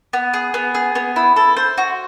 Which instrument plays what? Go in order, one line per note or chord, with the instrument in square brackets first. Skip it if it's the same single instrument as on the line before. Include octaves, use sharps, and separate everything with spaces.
[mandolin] B3
G#4
B3
G#4
B3
E4
A4
C5
F#4